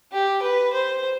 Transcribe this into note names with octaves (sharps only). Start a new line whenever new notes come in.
G4
B4
C5